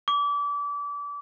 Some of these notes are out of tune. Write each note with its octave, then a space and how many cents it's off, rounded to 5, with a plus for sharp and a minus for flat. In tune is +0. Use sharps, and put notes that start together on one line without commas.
D6 -30